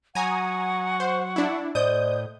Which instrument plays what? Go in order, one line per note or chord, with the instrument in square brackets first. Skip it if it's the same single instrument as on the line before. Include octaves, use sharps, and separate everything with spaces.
[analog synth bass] F#3 [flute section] F#5 C#6 [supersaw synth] G#5 A#5 D#6
[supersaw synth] C5
D4 E4
[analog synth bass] A2 [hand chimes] C5 D5 D#5 [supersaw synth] D#6 G6